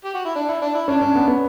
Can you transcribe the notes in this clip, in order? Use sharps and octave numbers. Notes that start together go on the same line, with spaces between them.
G4
F#4
E4
D4
E4
D4
E4
C#4 D4
C#4
B3
B3